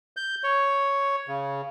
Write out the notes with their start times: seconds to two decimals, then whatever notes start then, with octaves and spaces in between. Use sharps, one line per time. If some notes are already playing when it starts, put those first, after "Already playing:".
0.17 G6
0.44 C#5
1.28 C#3